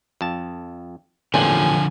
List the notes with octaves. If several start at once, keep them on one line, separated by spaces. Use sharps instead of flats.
F2 A5
A1 E2 A#2 D3 F3 G#5